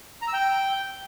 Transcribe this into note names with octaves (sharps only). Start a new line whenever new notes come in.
A#5
E6
G5